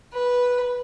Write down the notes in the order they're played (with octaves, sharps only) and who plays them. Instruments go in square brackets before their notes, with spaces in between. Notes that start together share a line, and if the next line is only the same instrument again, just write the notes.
[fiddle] B4